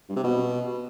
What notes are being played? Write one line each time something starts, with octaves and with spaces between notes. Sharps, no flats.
G2
C3
B2